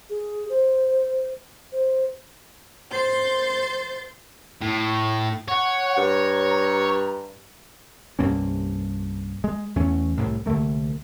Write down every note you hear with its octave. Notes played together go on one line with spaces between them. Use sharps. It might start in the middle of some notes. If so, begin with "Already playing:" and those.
G#4
C5
C5
C5 C6 G6 A6
A2
C#5 F#5
G2 A#5
C2 G2 A#3 C#4
G#3
E2 E3 A3 C#4
C2 A2
C2 D3 A3 A#3